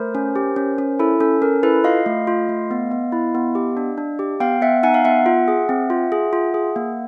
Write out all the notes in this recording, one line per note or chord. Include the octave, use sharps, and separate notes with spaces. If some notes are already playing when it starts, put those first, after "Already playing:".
Already playing: A3 A#4 C5
C#4
G4
C#4
C#4
E4 A4
C#4 A4
C#4 A#4
E4 A4 B4
F4 D#5 F5
A3
F4
A3
B3
B3
E4
B3
G4
D4
D4
G4
B3 F5 G5
B3 E5 F#5
D#4 F#5 G#5
F5
B3 E5 F#5
F4
G#4
C4
F4
G#4
F4
G#4
A#3